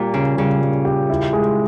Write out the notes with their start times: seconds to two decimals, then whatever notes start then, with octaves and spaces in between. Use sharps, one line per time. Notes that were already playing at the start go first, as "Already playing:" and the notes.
Already playing: A#2 G3 G4
0.13 C#3 C#4
0.37 C#3 G3
0.62 G3
0.85 G4
1.10 E4
1.33 G#3